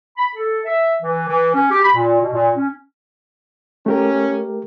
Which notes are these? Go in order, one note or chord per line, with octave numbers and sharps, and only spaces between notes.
B5
A4
E5
E3
E3
C#4
G4
B5
A#2
B2
A#2
C#4
A3 C#4 G4 A#4